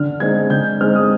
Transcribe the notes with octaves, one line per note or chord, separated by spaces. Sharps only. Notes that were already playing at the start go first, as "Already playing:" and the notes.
Already playing: D3 F6
G#3 C4 D#4 G#6
D3 G6
G#3 C4 D#4 F6
D#6